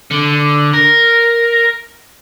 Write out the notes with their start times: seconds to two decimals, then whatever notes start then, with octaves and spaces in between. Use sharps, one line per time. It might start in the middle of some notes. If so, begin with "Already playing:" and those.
0.11 D3
0.73 A#4